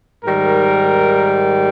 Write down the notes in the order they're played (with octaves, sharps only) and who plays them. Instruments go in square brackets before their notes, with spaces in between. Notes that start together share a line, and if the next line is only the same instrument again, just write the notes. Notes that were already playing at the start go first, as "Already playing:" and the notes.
[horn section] G#2 D#3 G3 A#4